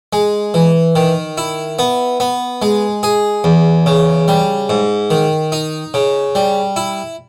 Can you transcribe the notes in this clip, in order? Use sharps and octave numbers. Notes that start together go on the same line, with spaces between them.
G#3
E3
D#3
E4
B3
B3
G#3
G#4
E2
C#3
G3
G#2
D#3
D#4
C#3
G3
E4